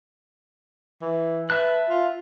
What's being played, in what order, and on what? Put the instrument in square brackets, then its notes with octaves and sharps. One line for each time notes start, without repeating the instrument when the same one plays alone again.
[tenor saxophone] E3
[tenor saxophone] B4 [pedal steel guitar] E5 A5 F#6
[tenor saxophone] F4